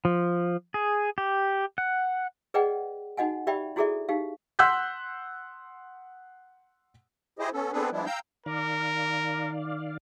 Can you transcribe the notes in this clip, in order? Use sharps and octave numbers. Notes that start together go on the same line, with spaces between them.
F3
G#4
G4
F#5
G#4 B4 D5 D#5 F#5 G5
D#4 F#4 D#5 F#5 G#5
G4 D5 E5 G5 B5
E4 F#4 G#4 A4 D5 E5
D#4 G4 F5
F#5 C6 E6 F#6 G6 B6
E4 G4 G#4 C5 D#5
B3 C#4 A4
B3 C4 D4 G#4 A4 B4
F3 G3 G#3 B3 D4 E4
F5 G5 A#5 E6 G6
D#3 A#4 D5 F5